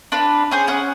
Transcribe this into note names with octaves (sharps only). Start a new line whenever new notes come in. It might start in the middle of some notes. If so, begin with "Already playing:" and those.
D4 F4 B4
C#4 G#4 C5
C#4 F#5 D#6